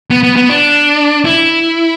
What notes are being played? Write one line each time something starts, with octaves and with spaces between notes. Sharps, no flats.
B3
B3
B3
D4
E4